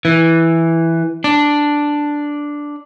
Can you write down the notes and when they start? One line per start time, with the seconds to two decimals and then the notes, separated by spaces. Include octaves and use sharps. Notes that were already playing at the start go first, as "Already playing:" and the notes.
0.05 E3
1.24 D4